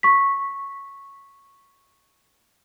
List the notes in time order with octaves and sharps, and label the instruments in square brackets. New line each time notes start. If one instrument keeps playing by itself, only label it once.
[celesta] C#6 B6